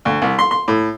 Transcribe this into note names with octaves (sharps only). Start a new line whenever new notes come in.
D2
C2
C6
C6
A2